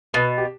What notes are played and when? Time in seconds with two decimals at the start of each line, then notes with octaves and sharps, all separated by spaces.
0.14 B2 B4
0.38 G4